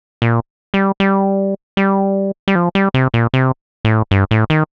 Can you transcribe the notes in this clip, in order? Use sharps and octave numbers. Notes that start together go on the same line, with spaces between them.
A#2
G3
G3
G3
G3
F3
G3
C3
A#2
C3
A2
G2
A2
D#3